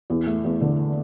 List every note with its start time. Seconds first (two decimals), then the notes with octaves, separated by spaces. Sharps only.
0.10 E2
0.27 A3
0.45 E2
0.61 D3